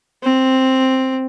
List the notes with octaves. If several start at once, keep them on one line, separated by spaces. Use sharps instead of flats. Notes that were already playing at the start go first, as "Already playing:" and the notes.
C4